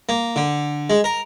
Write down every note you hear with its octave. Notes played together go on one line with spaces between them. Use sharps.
A#3
D3
G#3
A#4